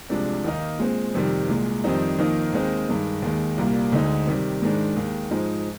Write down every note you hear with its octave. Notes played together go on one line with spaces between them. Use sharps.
C2 C3 F3 G#3 D4
D#2 D#3 A#3 D#4
A#2 G#3 C4
F2 C3 D#3 G3
C2 A#2 G#3
F2 D#3 G3 C4 D#4
F2 D#3 A#3 D#4
D#2 D#3 G#3 C4 D#4
G2 D#3 G#3
D#2 D#3 G#3
C2 A#2 G3 A#3
D2 D3 G#3 D#4
C3 D#3 G3
G#2 D#3 G#3 D4
D#2 D#3 G#3
G#2 F3 G#3 D#4